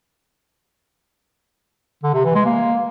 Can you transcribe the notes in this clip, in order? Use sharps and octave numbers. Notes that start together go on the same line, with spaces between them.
D3
C3
E3
G#3
A#3